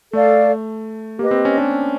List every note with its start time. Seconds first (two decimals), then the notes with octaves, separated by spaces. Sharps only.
0.13 A3 A4 D5 F5
1.18 A#3 G4 B4 D#5
1.31 C4
1.45 C#4
1.57 D4